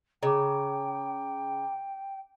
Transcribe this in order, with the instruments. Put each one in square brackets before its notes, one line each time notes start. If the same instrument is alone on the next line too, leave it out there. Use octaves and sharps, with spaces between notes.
[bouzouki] C#3 [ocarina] G5 [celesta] A#5 D6